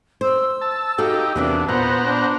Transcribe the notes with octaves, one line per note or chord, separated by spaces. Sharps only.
C5 E6
A5
D#4 F#4 G4 A4 F5
E2 C3 A#3 B3 D4 E4
A#2 B3 C5 F#5 A#5
D4